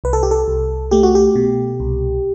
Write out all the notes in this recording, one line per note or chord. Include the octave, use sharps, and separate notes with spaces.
C2 B4
A4
G4
A4
C2
A3 G4
F#4
G4
B2
C2